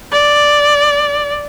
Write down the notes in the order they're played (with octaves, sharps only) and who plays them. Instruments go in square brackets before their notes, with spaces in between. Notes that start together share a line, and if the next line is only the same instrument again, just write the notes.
[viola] D5